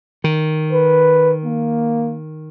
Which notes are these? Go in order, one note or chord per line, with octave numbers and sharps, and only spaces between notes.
D#3
B4
A#3